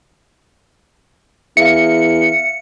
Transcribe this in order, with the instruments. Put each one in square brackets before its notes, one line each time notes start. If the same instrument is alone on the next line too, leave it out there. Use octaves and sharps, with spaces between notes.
[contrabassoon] E2 [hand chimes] E5 F5 [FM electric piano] C#7